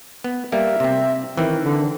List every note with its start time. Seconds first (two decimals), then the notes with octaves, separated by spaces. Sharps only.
0.24 B3
0.52 G3 A#3 A#4 E5
0.80 C3 C4
1.37 D#3 E3 C4
1.64 D3